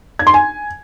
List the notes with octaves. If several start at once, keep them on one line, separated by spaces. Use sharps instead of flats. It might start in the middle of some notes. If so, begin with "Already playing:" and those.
G#6
C6
G#5